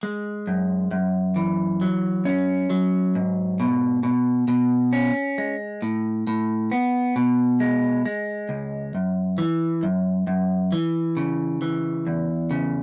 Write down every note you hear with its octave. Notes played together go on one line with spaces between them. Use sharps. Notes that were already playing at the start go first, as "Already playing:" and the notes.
G#3
F#2
F#2
E3
F#3
C#4
F#3
G#2
B2
B2
B2
C#4
G#3
A2
A2
B3
B2
G#3
G#3
C#2
F#2
E3
F#2
F#2
E3
C#3
E3
E2
C#3